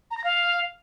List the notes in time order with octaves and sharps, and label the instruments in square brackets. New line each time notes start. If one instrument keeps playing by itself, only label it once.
[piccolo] A#5
A#6
F5